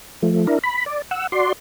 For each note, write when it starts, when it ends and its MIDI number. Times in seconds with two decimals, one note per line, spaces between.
0.22 0.47 53
0.22 0.47 57
0.47 0.59 62
0.47 0.59 64
0.47 0.59 70
0.64 0.85 83
0.86 1.02 74
1.11 1.27 78
1.11 1.27 88
1.32 1.53 66
1.32 1.53 74
1.32 1.53 84